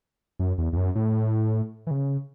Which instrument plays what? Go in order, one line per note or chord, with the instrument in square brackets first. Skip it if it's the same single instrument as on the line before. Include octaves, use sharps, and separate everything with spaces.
[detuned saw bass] F#2
E2
E2
F#2
A2
E3
C#3